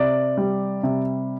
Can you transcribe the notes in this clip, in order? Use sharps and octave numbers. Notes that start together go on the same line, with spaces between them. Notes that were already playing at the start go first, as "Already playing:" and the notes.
Already playing: C3 D5
G3
C3